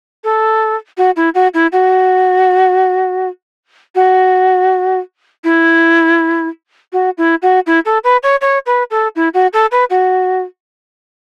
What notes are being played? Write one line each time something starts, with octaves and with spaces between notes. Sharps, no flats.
A4
F#4
E4
F#4
E4
F#4
F#4
E4
F#4
E4
F#4
E4
A4
B4
C#5
C#5
B4
A4
E4
F#4
A4
B4
F#4